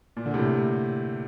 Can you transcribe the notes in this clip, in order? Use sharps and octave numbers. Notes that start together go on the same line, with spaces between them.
A#2
D3
A2 C3